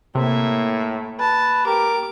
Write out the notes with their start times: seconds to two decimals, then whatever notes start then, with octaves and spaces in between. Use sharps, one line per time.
0.15 A2 C3 A#3 E5
1.20 B4 A5
1.66 G4 A#4 D6